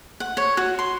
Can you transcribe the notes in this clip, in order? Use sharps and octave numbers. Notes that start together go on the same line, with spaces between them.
F#5
C#5
F#4
C6